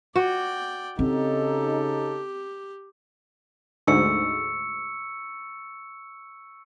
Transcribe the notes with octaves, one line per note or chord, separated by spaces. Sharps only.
F#4 D5 G5
C#3 C4 D#4 G4 A4
D2 G#2 C#6 E6 C#7